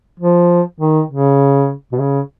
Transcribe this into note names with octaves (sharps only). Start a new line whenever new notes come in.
F3
D#3
C#3
B2
C#3